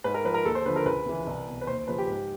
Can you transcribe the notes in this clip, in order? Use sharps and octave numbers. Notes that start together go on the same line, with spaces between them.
G#2 B4
A#4
F3 B4
A#4
D#2 A4
C5
D3 F3 B4
A#4
C#2 B4
C#3 E3
C2
B2
B4
D#2 C5
C#3 F3 B4
G4
G#2